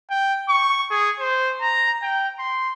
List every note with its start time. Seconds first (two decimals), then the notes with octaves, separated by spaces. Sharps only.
0.10 G5
0.49 C#6
0.90 G#4
1.20 C5
1.61 A#5
2.02 G5
2.39 C6